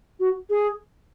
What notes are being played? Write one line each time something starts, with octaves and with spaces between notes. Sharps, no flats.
F#4
G#4